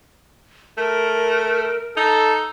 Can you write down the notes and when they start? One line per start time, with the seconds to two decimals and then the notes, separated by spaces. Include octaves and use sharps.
0.77 A3 A#4
1.97 D#4 A4